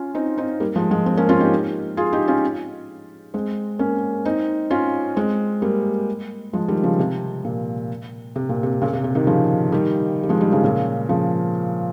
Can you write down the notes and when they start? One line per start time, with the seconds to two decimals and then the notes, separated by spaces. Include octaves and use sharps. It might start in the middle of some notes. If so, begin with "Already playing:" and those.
Already playing: C#4 F4
0.15 C4 D#4
0.38 C4 D#4
0.60 G3 A#3
0.76 F3 G#3
0.91 F3 G#3
1.06 G#3 C4
1.17 A#3 C#4
1.29 C#4 F4
1.40 D#4 G4
1.97 F4 G#4
2.13 D#4 G4
2.28 C#4 F4
3.34 G#3 C4
3.79 A#3 C#4
4.25 C4 D#4
4.70 C#4 F4
5.16 G#3 C4
5.62 G3 A#3
6.53 F3 G#3
6.68 D#3 G3
6.83 C#3 F3
6.99 C3
7.45 A#2
8.36 C3
8.49 A#2
8.63 C3
8.82 A#2 C#3
8.93 C3
9.04 C3
9.15 C3 D#3
9.27 C#3 F3
9.72 D#3 G3
10.23 G3
10.29 F3 G#3
10.41 D#3 G3
10.52 C#3 F3
10.64 A#2 C#3
11.09 C#3 F3